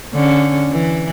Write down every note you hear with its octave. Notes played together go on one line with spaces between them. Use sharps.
D3 C#4
E3